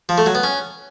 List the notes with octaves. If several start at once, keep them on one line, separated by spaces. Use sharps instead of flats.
F3
A3
F#3
B3
C#4